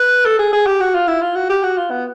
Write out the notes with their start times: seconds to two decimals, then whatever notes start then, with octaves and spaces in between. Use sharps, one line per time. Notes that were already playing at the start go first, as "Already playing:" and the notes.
Already playing: B4
0.25 A4
0.39 G#4
0.53 G#4
0.66 G4
0.80 F#4
0.94 F4
1.08 E4
1.21 F4
1.36 F#4
1.50 G4
1.63 F#4
1.77 F4
1.91 B3